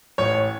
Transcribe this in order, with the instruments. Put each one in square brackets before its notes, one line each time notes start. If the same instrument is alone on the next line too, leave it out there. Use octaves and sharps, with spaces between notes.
[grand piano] A1 C#5